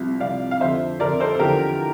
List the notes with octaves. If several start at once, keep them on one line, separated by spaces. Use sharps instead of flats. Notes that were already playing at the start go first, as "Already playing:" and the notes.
Already playing: C2 C3 F3
C2 C3 F3 D5 F5
F5
F2 D3 F3 C5 E5
F2 D3 F3 A#4 D5
A4 C5
A4
E2 D3 F3 G4 A#4